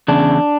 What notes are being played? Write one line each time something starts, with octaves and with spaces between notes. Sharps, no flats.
E2 C#3 D4